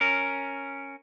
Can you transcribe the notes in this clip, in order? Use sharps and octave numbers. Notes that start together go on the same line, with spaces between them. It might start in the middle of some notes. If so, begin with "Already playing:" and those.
C#4 A#4